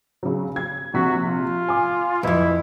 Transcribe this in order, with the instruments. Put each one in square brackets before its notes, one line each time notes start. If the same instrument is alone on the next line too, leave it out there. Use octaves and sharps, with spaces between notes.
[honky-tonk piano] C#3 F#3
G#6
[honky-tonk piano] A#1 C3 B6 [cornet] F#4
[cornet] F4
[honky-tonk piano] G#5 D6
[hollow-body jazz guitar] B1 F2 [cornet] E4 [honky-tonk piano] B4